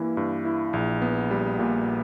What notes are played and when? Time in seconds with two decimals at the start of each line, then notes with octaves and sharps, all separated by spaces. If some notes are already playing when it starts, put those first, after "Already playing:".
Already playing: G2 E3 A#3 E4
0.17 G2
0.45 E4
0.73 A#1
1.02 B3
1.31 G3
1.59 A#2